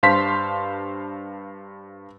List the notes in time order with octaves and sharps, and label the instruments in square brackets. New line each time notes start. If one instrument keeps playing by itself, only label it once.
[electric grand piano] G2 C5 F5 A5 C6 B6